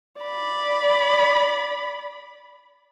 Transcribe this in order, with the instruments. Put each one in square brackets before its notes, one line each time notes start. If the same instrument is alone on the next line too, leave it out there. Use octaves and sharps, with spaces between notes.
[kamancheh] D5 B5